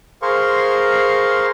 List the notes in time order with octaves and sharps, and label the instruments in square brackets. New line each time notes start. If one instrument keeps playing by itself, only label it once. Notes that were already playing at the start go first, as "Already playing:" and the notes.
[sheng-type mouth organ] G#4 A#4 C5 F5 C6 C#6